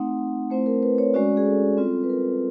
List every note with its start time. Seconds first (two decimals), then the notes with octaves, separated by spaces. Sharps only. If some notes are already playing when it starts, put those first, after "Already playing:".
Already playing: A3 C4 D#4 F#5
0.50 A3 C4 E4 C5
0.66 A#4
0.83 B4
0.98 C#5
1.14 G#3 C#4 F#4 D5
1.37 G#4
1.46 A4
1.77 G3 C4 F4
2.03 B4
2.10 A#4